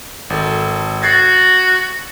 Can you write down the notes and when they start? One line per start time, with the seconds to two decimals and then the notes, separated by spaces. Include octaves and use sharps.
0.30 G#1 A4
1.03 F#4 G#6 A6 C7